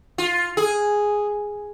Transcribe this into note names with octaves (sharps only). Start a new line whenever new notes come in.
F4
G#4